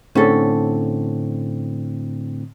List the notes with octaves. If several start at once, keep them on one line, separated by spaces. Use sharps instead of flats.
A2 D3 C4 C#4 A4